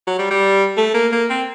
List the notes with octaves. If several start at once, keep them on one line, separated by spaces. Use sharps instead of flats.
F#3
G3
G3
A3
A#3
A#3
C4